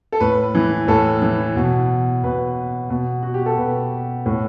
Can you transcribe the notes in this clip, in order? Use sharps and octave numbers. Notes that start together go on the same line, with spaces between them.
A4
A2 B4
E3
A2 A4
E3
B2
B2 B4
B2
F#4
G4
A4
B2 B4
A2